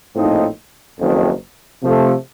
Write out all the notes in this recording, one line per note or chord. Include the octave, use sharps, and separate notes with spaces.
A#1 A2 F3 C4 D#4
F#1 F2 D#3
C3 F3 A3